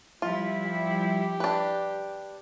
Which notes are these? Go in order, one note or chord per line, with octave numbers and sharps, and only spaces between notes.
F3 G3 E4 F4
G4
D4 B4